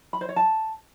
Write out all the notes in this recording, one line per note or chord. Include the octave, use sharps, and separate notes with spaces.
B5
C5
C#5
A5